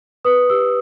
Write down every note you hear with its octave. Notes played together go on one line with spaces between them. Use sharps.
B4 D#6
G4 E6